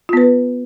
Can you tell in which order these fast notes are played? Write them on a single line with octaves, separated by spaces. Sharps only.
F4 B3 B4